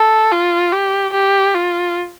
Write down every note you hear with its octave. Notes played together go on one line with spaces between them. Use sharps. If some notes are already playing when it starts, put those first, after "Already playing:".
Already playing: A4
F4
G4
G4
F4